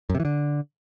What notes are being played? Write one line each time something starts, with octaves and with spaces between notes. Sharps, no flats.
F#2
C3
E3
D3